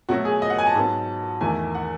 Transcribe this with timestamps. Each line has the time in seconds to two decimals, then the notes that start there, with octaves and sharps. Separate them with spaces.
0.09 B2 F#3 A3 F#4
0.25 G#4
0.42 D#5
0.50 F#5
0.58 G#5
0.67 A5
0.75 G#2 F#3 B3
1.41 E2 D#3 A3 G#5
1.75 F#5